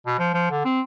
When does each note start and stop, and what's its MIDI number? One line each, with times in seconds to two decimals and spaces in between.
0.07 0.16 47
0.19 0.31 53
0.34 0.48 53
0.51 0.62 50
0.65 0.81 60